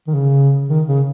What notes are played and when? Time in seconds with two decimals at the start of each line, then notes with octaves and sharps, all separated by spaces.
0.07 D#3
0.14 C#3
0.68 D#3
0.87 C#3